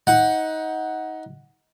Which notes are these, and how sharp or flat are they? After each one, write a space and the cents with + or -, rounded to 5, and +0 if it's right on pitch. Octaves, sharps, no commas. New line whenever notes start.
D#4 +25 F#5 +0